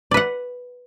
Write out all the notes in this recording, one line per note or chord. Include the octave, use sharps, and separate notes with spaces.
B4 D5 F#5